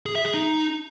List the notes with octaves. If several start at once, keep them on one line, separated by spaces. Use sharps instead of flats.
G#4
E5
G#4
D#4